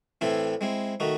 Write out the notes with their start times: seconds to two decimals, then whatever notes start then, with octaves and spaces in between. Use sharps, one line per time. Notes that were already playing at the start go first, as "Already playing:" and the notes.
0.21 A2 E3 C4 E4 A4
0.61 G#3 C4 E4
1.00 D#3 A3 D#4 F#4